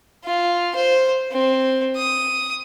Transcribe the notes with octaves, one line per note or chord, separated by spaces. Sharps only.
F4
C5
C4
D#6